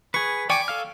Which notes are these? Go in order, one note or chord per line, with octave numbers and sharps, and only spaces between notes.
G#4 B4 C#6
D5 G5 G#5 C#6 D6
A4 F5 F6